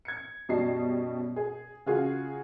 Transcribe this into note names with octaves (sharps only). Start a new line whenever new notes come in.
G#6 C#7
F#2 B2 G3 D#5 A5 C7
G#4
C#3 F4 F#4 G#4